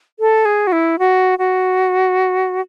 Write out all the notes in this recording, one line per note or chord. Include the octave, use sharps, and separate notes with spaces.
A4
G#4
F#4
E4
F#4
F#4